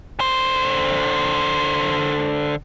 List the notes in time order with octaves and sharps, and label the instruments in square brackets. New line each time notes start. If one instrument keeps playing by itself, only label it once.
[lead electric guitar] D3 C5